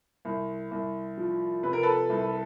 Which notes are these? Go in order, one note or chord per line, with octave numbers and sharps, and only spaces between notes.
C2
C2
F3
C3 B4
A#4
A4 B4
C2